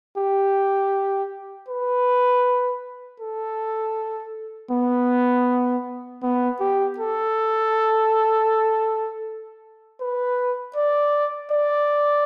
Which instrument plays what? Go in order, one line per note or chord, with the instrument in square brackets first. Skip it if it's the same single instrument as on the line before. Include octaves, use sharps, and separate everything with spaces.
[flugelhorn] G4
B4
A4
B3
B3
G4
A4
B4
D5
D5